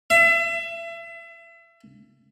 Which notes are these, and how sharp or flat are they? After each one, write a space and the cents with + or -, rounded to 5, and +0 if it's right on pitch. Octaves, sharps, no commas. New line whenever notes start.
E5 +35